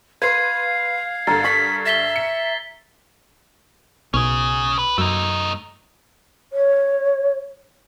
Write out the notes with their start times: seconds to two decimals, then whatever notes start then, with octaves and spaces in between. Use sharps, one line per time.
0.22 B4 F5 C6 G#6 C7
1.27 G2 D3 A#4 A#5 A6
1.44 C#6 B6
1.86 E5 A6 B6 G7
2.16 C#7
4.14 B1 C#4 G#4
4.79 B4
4.98 F#2 A3 D#4
6.53 C#5